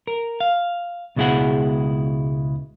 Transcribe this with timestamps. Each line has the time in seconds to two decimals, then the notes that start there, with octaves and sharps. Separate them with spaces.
0.07 A#4
0.40 F5
1.16 C#2 B2 G#3 E4 G#4 F#5